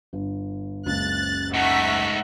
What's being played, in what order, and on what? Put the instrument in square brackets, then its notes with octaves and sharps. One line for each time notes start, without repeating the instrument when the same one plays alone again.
[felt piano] G1
[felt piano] F#1 C#2 [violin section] F#6 A6
[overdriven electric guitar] G#2 A3 [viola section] E5 F#5 [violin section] C#6 B6